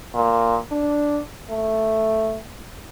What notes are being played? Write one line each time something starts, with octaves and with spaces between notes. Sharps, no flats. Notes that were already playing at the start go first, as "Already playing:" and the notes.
A#2
D4
A3